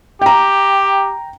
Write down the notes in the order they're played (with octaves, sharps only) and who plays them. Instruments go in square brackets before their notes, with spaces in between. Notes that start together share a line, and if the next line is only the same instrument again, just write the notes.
[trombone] G4 [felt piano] G5 A#5